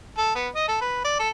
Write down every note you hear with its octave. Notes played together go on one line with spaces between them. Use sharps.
A4
B3
D#5
A4
B4
D5
A4